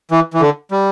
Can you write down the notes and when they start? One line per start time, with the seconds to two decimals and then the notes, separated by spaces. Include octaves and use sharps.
0.11 E3
0.34 E3
0.41 D3
0.71 G3